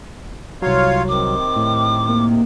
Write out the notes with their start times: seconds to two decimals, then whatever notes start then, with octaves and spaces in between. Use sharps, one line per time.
0.62 C2 F#3 F4 C#5 F5
1.08 C3 D#3 D6
1.56 A2
2.08 A#3